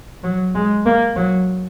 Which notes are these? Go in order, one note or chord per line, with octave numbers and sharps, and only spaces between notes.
F#3
G#3
A#3
F#3